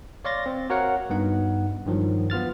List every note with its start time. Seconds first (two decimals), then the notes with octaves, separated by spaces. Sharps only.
0.25 C#5 D5 F5 C6 A6 A#6
0.46 C4
0.70 F#4 A#4 C#5 F5 F#5
1.10 G2 B3 D#4 F#5
1.86 G2 D#3 F3 F#3
2.30 B3 F4 F6 A6